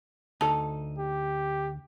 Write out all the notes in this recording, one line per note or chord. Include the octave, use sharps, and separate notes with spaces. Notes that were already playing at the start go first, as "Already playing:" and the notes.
D2 D#4 A4 A5
G4